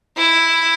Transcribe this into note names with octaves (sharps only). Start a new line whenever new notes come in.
E4